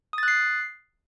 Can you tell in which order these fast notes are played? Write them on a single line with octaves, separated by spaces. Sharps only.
D#6 A6 F#6 C7